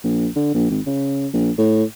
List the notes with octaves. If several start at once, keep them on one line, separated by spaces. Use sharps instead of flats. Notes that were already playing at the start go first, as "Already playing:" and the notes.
A#1
D3
A#1
G#1
C#3
A#1
A2